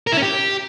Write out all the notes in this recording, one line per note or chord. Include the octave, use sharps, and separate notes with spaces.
A#4
E4
C#4
G4